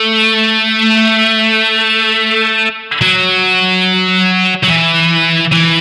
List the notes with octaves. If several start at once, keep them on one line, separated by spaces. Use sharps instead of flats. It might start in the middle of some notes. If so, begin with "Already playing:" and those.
Already playing: A3
F#3
F#3
E3
E3